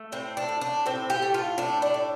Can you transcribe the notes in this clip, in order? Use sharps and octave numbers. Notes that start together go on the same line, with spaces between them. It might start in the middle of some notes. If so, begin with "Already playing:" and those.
Already playing: A3
A2 C4
D4
A2
D4
A2 C4
G4
A3
F4
A2 D4
D4
A2